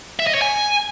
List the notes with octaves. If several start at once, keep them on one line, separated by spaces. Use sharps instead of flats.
E5
D#5
C#5
G#5